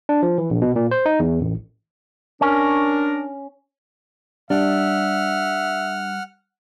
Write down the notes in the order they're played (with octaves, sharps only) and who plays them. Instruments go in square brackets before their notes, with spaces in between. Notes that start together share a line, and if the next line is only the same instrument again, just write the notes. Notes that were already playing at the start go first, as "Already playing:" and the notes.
[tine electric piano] D4
F3
E3
A#1
B2
A#2
C5
D#4
E2
A1
[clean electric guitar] C#4 [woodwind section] D4 A#4
[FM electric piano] G3 [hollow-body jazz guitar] D4 [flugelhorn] E5 [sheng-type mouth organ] F#5 F6